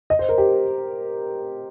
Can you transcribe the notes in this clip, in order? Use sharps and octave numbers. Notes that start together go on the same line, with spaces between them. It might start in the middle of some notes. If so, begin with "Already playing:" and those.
D#5
C5
A#4
G4